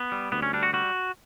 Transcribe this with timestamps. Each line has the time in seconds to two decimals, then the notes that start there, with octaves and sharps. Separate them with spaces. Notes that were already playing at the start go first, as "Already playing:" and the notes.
Already playing: B3
0.12 G3
0.32 D2 B3
0.42 C#4
0.53 G3 D4
0.63 F#4
0.73 G3 F#4